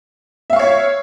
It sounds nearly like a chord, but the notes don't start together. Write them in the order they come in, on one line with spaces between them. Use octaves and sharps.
E5 F5 C#6 C#5